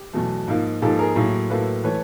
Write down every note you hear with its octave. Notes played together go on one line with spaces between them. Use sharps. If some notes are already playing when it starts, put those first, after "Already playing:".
Already playing: G4
E2 B2 F#3 A3
G#2 F3 A#3
G#2 F3 A#3 G4 A4
G#4 A#4
A2 F#3 A#3
A2 F#3 A#3 A4 B4
E3 A3 B4 C#5